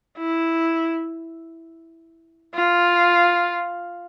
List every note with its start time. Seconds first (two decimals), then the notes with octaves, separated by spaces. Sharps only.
0.18 E4
2.55 F4